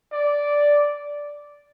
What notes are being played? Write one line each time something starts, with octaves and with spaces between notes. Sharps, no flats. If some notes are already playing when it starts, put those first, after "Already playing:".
D5